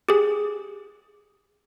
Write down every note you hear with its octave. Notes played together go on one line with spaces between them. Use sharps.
G4 G#4